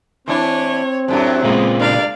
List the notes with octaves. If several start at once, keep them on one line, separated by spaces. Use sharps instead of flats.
E3 C4 D4 E4 C#5
F#2 A2 F#3 D4 G4
A#2 C#3 G#3 B3 F4
G2 A#4 D5 F5